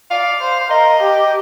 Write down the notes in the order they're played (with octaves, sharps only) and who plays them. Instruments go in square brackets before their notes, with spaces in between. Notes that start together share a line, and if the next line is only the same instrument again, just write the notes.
[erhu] D5 [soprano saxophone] F5
[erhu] C5
[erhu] A#4 [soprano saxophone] D#5
[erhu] G4